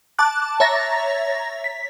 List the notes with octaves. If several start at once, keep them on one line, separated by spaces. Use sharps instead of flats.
A5 D6 F#6
C#5 E5 A#5 A6 A#6
B6